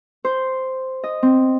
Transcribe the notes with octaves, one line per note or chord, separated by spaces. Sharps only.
C5
D#5
C4